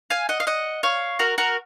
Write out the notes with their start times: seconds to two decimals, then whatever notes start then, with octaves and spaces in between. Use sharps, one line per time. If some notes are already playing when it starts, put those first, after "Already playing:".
0.10 F5 G#5
0.29 D#5 F#5
0.40 F5
0.47 D#5 F#5
0.83 C#5 F5
1.19 F#4 A#4
1.38 F#4 A#4